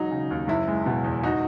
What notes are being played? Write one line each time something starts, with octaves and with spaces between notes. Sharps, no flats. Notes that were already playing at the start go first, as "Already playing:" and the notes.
Already playing: E1 F#3 D#4
C#3
D#2
F#1 E4
G#3
B2
E2
G#1 D#4 F#4